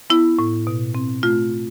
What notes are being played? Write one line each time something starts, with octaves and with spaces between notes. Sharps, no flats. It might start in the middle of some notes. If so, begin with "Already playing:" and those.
B3 E4
A2
B2
C4
A3 F4